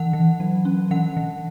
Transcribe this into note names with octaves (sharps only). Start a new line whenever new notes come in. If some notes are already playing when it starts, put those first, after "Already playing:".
Already playing: E3 F#5
E3
F#3
C#4
E3 F#5
E3